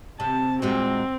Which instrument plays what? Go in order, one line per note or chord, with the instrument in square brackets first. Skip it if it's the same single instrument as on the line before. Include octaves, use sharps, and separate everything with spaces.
[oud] C3 [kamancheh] A5
[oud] A#2 G#3 F#4 [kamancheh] C4